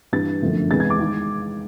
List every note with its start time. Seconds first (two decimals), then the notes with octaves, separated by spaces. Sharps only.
0.13 G2 E3 G3 A6
0.42 G1 F#2 D3 F3 A3
0.70 F1 E2 C3 E3 G#3 A6
0.80 G#6
0.90 D6
1.00 D#3 G#3